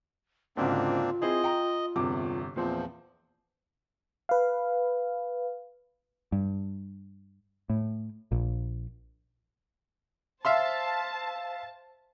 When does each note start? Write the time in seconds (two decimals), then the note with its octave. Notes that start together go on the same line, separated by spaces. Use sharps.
0.57 D2 G#2 C#3 A#3 C4 D4 F4
1.22 C4 E4 G#4 D#5
1.44 G5 A#5
1.96 G1 E2 C3 D6
2.56 E2 A#2 F3 C4
4.29 B4 F5
6.32 G2
7.70 A2
8.32 A#1
10.45 C5 E5 F5 A5 C6